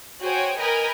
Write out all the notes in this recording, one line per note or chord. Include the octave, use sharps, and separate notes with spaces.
F#4 G#4 C5 C#5 G5 G#5
A#4 B4 D#5 G5 G#5 B5